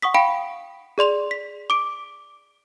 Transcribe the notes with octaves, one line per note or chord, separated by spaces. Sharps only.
F#5 C#6 D#6 B6
F5 G5 B5 B6 D7
G#4 D5 C6 F7
B6
D6 D7